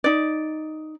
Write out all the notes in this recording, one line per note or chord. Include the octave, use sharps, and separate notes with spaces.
D#4 D5